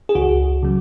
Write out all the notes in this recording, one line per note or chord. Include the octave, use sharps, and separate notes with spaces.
G#4
C#2 F#4
C#3 F#3